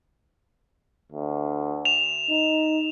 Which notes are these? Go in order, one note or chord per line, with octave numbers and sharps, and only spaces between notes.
D2
E7 F7
D#4